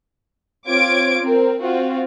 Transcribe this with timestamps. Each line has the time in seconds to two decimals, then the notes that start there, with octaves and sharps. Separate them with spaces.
0.67 C4 F4 C#5 D6 G#6 D7
1.22 C4 A#4
1.61 C4 F4 F#4